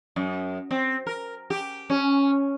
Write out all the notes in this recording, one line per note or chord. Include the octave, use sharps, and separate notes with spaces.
F#2
C4
A#4
G4
C#4